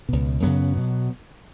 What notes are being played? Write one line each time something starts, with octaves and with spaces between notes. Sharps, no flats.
C#2 B2
F#2 C#3 F#3 B3
B2